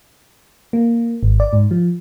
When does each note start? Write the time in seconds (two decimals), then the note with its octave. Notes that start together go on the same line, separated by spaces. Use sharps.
0.73 A#3
1.23 G#1
1.40 D5
1.53 G#2
1.71 F3